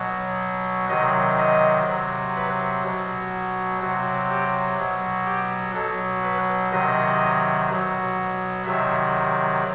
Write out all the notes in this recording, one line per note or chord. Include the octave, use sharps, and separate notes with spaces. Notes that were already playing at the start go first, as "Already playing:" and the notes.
Already playing: B2 F#3
C3 D#3 F#3 D#5
D#5
C3 F#3
B4
B2 F#3
C3 F#3
G4
B2 F#3
G4
B2 F#3 A4
B4
C3 D#3 F#3 D#5
B2 F#3
C3 D#3 F#3 E5